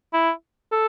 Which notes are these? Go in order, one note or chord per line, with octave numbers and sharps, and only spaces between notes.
E4
A4